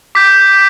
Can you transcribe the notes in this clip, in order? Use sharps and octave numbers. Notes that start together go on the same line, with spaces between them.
D6 G6 B6